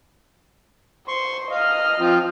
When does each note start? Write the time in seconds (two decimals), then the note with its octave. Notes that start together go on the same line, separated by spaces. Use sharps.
1.08 C5 C6 C#6
1.51 D#5 F5 F6
1.99 F3 C4 F4